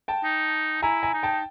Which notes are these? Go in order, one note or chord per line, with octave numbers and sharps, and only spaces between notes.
G5 A5
D#4
E4 G#5 A#5
G#5 A#5
D#4
G5 A5